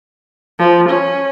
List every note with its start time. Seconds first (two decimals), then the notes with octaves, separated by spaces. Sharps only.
0.59 F3
0.89 C#4